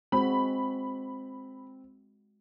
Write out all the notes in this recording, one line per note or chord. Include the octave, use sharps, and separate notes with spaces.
G#3 C4 F#4 B5